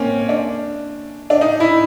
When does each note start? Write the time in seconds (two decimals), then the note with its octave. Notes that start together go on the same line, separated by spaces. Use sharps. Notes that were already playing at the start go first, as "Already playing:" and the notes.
Already playing: A#3 C4 C#4
0.29 D4
1.30 D4
1.41 D#4
1.60 E4